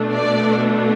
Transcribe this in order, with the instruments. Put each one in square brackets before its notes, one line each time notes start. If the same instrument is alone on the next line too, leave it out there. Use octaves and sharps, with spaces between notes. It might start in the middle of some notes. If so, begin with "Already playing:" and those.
Already playing: [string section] B2 A3 D4
D5